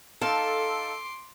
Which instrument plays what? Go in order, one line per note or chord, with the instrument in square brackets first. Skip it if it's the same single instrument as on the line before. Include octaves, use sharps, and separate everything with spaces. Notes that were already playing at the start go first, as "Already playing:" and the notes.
[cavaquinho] D#4 F5 [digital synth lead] A4 [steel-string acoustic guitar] A5 [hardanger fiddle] C6 D6